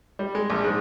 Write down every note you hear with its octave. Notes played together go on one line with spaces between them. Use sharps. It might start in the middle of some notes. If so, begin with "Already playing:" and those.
G3
G#3
A#1
G#2